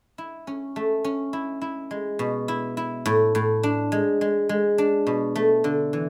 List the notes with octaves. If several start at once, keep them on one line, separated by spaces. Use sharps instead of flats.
E4
C#4
A3
C#4
E4
E4
G#3
B2
E4
E4
A2
A2
D4
G#3
G#3
G#3
D4
B2
A3
D3
E3